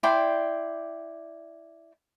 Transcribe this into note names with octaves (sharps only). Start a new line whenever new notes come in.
E4 D5 G5 C6